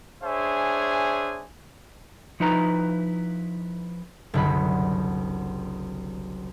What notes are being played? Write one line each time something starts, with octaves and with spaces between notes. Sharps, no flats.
D4 G#4 C5 C#5 E5 G#5
F3 D#4 E4 B4 A#5
F#1 C2 D3 F#5 B5